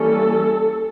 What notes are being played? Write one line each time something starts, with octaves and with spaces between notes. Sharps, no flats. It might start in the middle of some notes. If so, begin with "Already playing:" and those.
Already playing: E3 G3 A#3 C#4 A4